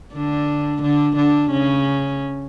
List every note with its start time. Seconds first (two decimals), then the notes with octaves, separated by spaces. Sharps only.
0.14 D3 D4
0.82 D3 D4
1.16 D3 D4
1.51 C#3 C#4